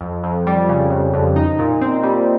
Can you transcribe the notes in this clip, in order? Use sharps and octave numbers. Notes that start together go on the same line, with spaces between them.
F2
F2
G3
C#3
F2
F2
D#4
A#2
C4
G3